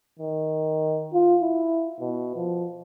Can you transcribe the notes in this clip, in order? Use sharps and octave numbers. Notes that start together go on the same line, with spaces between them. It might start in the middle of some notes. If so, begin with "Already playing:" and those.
D#3
F4
E4
B2
F3